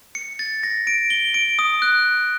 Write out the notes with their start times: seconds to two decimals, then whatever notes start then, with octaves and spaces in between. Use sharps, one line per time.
0.15 C#7
0.39 A6
0.63 A#6
0.87 D7
1.10 G7
1.34 D7
1.59 D#6
1.82 F#6